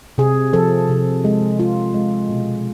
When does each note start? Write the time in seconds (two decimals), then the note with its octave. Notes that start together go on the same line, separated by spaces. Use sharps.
0.18 C3 G#4
0.53 F3 A4
0.89 C3
1.25 G#3
1.59 G#3 F4
1.94 G#3
2.30 B2